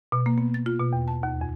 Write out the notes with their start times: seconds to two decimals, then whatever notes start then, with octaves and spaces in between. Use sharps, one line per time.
0.12 B2
0.26 A#3
0.38 B3
0.54 A6
0.66 F4
0.80 B2
0.93 E2
1.08 A5
1.23 D#2
1.41 F2